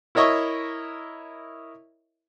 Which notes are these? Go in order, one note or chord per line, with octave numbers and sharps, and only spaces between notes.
E4 A#4 C#5 D#5 E5 C#6